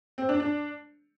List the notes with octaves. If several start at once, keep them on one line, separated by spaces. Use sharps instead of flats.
C4
D4
D4